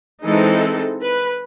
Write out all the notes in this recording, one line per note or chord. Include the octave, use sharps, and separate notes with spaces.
E3 G#3 C4 D#4 A4
B4